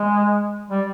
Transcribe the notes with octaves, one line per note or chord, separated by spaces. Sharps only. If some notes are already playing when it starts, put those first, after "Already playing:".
Already playing: G#3
G3